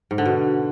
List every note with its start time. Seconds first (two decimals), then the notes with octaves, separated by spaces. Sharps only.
0.11 G#2
0.18 D3
0.26 B2